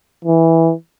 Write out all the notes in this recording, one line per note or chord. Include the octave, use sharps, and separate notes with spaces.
E3